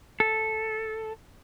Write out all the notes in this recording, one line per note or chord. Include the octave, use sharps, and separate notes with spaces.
A4